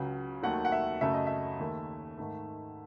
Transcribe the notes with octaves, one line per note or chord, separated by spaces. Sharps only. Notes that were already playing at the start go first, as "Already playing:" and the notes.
Already playing: C#2 C#3 F#3
D#2 D#3 F#3 A3 F#5
F#5
E5
F#2 C#3 F#3 A3 E5
D#5
E5
D#2 D#3 A3
G#2 D#3 A3